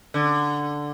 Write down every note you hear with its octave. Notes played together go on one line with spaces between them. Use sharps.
D3